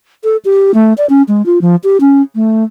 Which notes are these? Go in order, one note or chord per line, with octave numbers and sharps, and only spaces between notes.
A4
G4
A3
D5
C#4
G#3
F4
F3
G4
C#4
A3